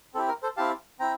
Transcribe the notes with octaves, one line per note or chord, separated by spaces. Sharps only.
C4 E4 G4 A4
A#4
A4 C5
C4 E4 G4 F5 A5
C4 E4 G5 A#5